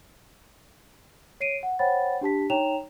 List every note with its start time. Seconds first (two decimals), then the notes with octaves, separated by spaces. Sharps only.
1.40 C#5 C7 D7 D#7
1.63 F#5
1.79 C5 C#5 F#5 G5 B5 A6
2.21 D4 G4 A5 B6
2.50 D#4 C#5 G5 A#5 E7 F7